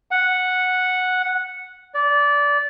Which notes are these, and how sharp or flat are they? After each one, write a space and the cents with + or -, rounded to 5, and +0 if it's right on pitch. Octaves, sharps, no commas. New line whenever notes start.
F#5 -5
D5 -20